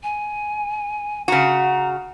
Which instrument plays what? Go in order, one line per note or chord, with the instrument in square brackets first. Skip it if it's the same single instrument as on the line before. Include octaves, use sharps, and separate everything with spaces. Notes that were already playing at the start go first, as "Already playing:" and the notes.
[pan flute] G#5
[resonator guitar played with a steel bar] C#3 F#4 [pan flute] A#5